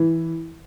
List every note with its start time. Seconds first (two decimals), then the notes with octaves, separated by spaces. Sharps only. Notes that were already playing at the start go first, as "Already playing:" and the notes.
Already playing: E3